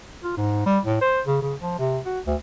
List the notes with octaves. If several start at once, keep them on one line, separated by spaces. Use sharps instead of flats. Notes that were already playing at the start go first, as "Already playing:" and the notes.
F4
G#2
G3
A2
C5
C#3
C#3
F3
C3
F#4
D2